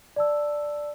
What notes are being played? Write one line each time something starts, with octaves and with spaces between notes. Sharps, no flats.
D5 A5 E6